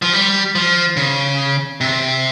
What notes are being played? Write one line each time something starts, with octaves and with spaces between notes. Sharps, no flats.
F3
G3
F3
C#3
C3